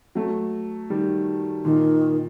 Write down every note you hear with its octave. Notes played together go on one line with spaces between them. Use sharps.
F#3 A3
D#3 G3
A#2 D#3